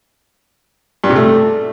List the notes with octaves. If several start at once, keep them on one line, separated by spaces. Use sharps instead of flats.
G2
C3
A3